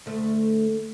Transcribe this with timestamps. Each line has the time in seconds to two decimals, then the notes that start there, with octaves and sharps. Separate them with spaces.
0.06 D2 A3